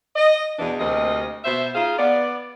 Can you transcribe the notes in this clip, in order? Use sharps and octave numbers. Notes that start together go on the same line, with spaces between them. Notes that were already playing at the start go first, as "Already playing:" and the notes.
D#5
E2 B2 E3 D4
D2 C3 A#3 D#5
B2 C5 E5
D#4 F4 G#4 F5
B3 D5